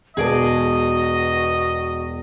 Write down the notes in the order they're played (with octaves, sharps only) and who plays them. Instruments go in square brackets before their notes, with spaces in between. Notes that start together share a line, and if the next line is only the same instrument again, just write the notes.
[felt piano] E1 B3 [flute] F#4 [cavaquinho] G#4 D5 A5 [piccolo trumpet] D#5